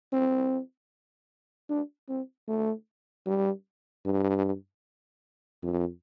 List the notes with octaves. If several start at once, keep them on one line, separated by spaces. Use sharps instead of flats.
C4
D4
C4
A3
G3
G2
F2